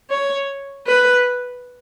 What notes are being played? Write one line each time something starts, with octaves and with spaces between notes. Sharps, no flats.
C#5
B4